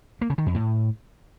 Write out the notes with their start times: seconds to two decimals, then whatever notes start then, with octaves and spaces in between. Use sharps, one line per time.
0.21 A#3
0.30 C#3
0.38 D#3
0.46 F2
0.55 A2